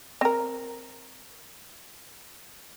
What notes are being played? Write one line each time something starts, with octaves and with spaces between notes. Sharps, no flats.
C4 A#4